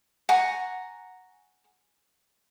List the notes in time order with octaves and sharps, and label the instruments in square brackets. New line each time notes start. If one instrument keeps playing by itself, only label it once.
[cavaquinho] F#5 G#5 A#5 C#6